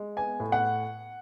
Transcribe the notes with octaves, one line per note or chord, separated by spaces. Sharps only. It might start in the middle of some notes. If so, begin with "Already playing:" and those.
Already playing: G#3
B3 G#5
A2
F#5